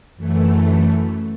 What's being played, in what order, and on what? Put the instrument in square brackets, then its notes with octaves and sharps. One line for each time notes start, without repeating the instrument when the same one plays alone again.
[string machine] F#2 E3 A3